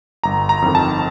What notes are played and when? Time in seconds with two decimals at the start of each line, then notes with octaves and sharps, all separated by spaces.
0.24 G1 A#5
0.49 A#5
0.62 F2 D#3
0.75 A5